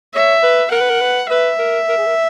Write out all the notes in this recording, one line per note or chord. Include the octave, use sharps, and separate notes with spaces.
C#5 E5
B4
A#4 F#5
B4
A#4
B4
B4 E5
A#4
A#4
G#4
A#4